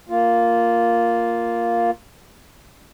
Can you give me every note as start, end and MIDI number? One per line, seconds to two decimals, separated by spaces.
0.09 1.91 58
0.09 1.91 65